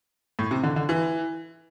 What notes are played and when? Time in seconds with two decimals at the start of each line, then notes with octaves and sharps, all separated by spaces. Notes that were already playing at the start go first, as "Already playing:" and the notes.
0.39 A2
0.51 C3
0.63 D3
0.76 D3
0.89 E3